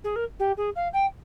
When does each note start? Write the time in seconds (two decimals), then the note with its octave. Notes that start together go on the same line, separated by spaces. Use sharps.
0.04 G#4
0.16 A#4
0.39 G4
0.57 G#4
0.76 F5
0.93 G5